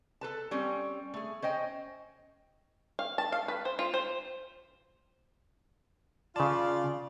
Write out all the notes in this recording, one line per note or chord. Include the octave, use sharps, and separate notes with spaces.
A4 B4 A5
G3 C4 C#4
A3 G#4
C#4 C5 D#5 G5
F5
A5
F5
B4
C5
F4
C5
C#3 F4 D5 A5